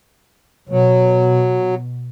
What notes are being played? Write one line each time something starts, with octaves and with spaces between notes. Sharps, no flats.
B2 F#3